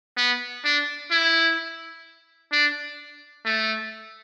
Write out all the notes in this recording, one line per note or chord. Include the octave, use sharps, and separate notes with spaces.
B3
D4
E4
D4
A3